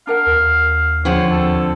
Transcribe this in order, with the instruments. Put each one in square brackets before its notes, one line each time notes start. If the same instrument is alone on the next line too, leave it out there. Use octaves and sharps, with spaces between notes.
[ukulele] D4 A#4 F#5 [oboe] F5
[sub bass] D#2
[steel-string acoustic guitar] D3 F3 C4 [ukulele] G#4 G5 [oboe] C#5
[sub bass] D#2 [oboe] A4